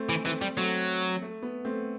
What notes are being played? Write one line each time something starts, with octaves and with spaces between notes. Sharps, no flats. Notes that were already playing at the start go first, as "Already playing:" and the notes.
Already playing: A3 C4
E3
E3 A3 C4
G3
F#3 A3 C4
A3
B3
A3 C4